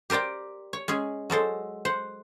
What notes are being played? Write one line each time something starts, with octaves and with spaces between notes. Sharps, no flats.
G4 A#4 C5 D5 G5
C#5
G#3 C#4 G#4
F#3 G#3 A4 C5
C5 F#5